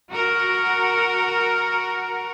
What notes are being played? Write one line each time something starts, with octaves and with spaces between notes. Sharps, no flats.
F#4 A#4